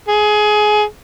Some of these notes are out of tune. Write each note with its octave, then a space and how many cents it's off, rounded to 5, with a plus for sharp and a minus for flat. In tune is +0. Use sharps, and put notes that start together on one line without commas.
G#4 +20